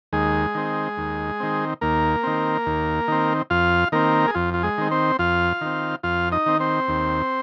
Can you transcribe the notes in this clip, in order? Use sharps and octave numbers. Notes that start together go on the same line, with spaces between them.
D#2 G#3 G#4
D#3 C4
D#2
D#3 C4
D#2 A#3 A#4
D#3 C4
D#2
D#3 C4
F2 F4 F5
D#3 A#3 C4 A#4
G#4
F2 F4
F4
G#3 G#4
D#3 C4
C4 C5
F2 F4 F5
D#3 C4
F2 F4 F5
D#4 D#5
D#3 C4
C4 C5
D#2